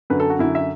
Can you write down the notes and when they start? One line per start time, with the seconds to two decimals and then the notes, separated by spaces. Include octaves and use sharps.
0.10 F#2 D3 B4
0.20 A4
0.30 F#4
0.39 F#2 D3 E4
0.55 E5